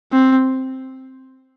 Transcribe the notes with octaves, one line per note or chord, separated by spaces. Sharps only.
C4